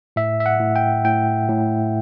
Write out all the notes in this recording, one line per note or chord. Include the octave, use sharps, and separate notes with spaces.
A2 E5
E5
F#5
A2
G5
A2 G5
A2